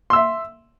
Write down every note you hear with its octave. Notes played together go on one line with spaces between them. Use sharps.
E5 C6 E6